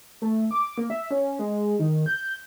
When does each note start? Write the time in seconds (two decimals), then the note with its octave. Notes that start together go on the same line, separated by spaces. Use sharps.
0.22 A3
0.51 D6
0.78 A#3
0.90 E5
1.11 C#4
1.39 G#3
1.79 D#3
2.06 G6